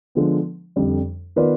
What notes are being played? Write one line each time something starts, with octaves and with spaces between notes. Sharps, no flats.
D3 F3 G#3 B3
F2 D3 G3 D4
D#3 B3 F4 B4 D5